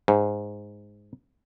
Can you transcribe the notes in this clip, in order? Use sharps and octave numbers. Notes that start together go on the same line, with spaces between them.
G#2